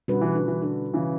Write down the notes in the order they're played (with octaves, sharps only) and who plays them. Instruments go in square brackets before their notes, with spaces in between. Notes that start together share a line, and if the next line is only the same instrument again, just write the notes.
[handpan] B2 G3 C#4 F#4 B4 [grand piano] D3
[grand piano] E3
D3
E3
D3
C#3 E3